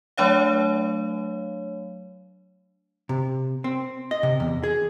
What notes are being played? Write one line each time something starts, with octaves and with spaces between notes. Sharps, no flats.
F#3 A3 D4 C#5 F5
C3
C4
D#5
C3
E2
G#4